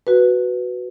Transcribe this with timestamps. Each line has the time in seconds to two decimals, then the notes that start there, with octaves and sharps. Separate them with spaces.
0.07 F#4 B4